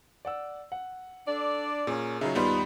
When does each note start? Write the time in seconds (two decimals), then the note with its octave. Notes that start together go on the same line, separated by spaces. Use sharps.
0.25 D5 F#5 E6
0.72 F#5
1.28 D4 A4 D5
1.87 A#2 C#4 G#4 A#4
2.21 C#3 F#3 D#4 F4 G#4 C#5 E5
2.35 D#2 G#2 G3 B3 D#4 F4 B5 C6